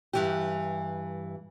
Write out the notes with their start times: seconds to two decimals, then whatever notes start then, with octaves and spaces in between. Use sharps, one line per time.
0.13 G2 E3 G4